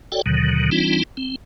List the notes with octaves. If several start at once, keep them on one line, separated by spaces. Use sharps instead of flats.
F#4 A4 C#5 D5 G5
D#2 B2 D3 D#3 F#3
E3 G3 C4 D4 D#4 F4
C4